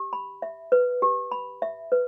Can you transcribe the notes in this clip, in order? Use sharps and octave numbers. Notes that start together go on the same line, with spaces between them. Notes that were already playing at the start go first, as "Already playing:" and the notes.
Already playing: G4
B5
E5
B4
G4
B5
E5
B4